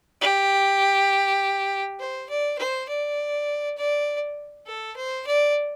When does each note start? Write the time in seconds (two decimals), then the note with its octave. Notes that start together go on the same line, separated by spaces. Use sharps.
0.21 G4
2.00 C5
2.30 D5
2.59 C5
2.89 D5
3.78 D5
4.67 A4
4.96 C5
5.27 D5